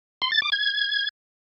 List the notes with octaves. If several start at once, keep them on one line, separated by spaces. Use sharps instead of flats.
C6
A6
D6
G#6